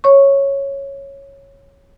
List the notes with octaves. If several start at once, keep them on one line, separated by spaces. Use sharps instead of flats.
C#5 C#6